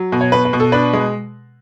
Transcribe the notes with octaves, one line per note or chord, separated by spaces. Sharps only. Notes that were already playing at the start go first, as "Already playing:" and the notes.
Already playing: F#3
B2
C#5
B2 B4
B4
B2
A4
D4 B4
G#3